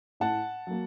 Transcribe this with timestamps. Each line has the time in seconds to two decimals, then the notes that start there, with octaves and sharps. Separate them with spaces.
0.20 A2 F#5 A5
0.67 F#3 A#3